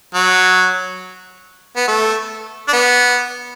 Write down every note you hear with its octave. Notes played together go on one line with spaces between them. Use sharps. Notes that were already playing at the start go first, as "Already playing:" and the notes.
F#3
B3
A3
D4
B3